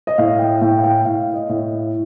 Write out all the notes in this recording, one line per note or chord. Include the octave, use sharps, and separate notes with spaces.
D#5
A2 F5
G5
A2 G5
F5
G5
A2 F5
D#5
A2